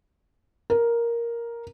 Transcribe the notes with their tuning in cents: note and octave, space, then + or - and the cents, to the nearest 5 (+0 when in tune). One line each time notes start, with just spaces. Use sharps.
A#4 +5